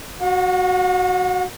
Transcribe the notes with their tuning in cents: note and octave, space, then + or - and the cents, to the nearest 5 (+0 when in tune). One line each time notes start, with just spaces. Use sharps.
F#4 +0 F#5 -45